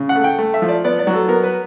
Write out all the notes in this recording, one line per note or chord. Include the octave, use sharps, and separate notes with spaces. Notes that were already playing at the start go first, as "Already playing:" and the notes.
Already playing: C#3
F#5
A3
G5
A3
E5
F3
D5
B3 D5
D5
F#3
A4
B3 A#4
B4